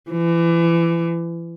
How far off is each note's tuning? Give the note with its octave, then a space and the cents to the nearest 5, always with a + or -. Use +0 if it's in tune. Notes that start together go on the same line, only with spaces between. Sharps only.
E3 +30